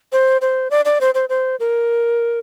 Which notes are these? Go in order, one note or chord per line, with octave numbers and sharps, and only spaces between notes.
C5
C5
D5
D5
C5
C5
C5
A#4